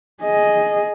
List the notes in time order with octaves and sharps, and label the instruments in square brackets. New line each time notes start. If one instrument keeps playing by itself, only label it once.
[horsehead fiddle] G#4 D#5